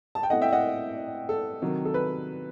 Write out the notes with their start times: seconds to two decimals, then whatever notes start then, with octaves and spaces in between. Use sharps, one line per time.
0.15 A5
0.23 G5
0.30 B2 A3 C4 E4 D#5 F#5
0.41 E5 G5
0.52 D#5 F#5
1.29 A4
1.62 C3 D#3 F#3
1.85 A4
1.94 B4